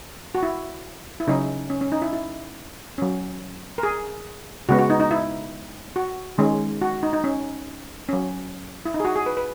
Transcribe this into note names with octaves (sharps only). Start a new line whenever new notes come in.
F#4
E4
E4
C#3 F#3 C#4 D#4
C#4
C#4
D#4
E4
E4
F#3 C#4
A#4
G#4
C#3 G#3 B3 F#4
F#4
D#4
D#4
E4
F#4
D#3 G#3 C#4
F#4
D#4
D#4
C#4
F#3 C#4
E4
D#4
G#4
F#4
G#4
B4
B4